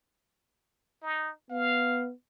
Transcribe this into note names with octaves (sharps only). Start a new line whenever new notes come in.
D#4
B3 F5